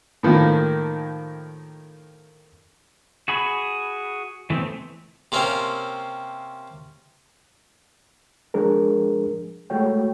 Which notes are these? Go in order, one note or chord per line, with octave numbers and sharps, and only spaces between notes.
A2 D#3 F3 A#3
F#4 G#4 B5
E3 A3 B3 C4
C3 A#3 C4 C#4
F3 G#3 D4 G#4 A#4
G#3 A3 F#4 C#5 G5